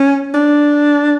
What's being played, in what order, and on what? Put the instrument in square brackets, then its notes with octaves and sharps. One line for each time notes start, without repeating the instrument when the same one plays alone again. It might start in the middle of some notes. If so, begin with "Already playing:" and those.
Already playing: [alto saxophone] C#4
D4